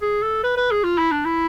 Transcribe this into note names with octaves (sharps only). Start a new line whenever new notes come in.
G#4
A4
B4
B4
G#4
F4
E4
D4
E4